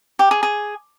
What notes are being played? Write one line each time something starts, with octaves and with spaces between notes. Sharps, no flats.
G4
G#4
G#4